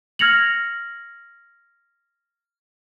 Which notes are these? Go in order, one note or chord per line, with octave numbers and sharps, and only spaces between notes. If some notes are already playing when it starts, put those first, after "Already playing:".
F6 G#6 A#6 C#7 F7 F#7